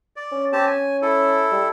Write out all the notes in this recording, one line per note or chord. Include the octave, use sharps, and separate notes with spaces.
D5
C#4
C4 G4 A5
G#5
E4 A4
G3